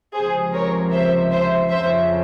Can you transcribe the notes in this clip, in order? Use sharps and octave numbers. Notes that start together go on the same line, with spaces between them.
C#2 C3 F3 G#4 C5
A#4 C#5
C5 E5
C5 E5
F2 C#3 F3 C5 E5